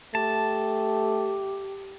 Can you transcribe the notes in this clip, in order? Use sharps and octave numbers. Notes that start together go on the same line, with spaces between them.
A3 G4 A5